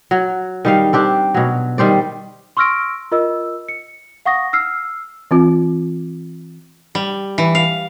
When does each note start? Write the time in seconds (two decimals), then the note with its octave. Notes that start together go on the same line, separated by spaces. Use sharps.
0.11 F#3
0.65 D#3 G3 F5
0.93 C4 D4 G4
1.34 B2 F#3
1.78 D#3 G3 C5 D5
2.57 C6 C#6 E6 F6 A#6 D7
3.12 F4 A#4 D#5 E6
3.68 C#7
4.26 F5 F#5 C#6 D#6 A#6
4.53 E6 F6 C7
5.31 E3 C4 F4
6.95 G3
7.38 E3
7.55 F5